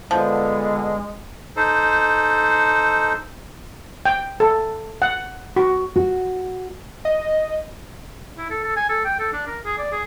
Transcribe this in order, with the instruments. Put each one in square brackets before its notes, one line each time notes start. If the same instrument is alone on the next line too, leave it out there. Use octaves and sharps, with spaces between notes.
[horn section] D3 B3 [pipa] F3 [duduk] G#3
[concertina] D#4 A4 C5
[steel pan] G5
A4
F#5
F#4
[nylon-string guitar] F#4
[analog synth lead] D#5
[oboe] E4
A4
A4
G#5
A4
G5
A4
D4
A#4
G#4
D5
G#4